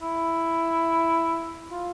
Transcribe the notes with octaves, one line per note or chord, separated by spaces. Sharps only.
E4
F4